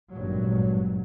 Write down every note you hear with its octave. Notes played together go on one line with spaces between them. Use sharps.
G#1 G2 A#2 F#3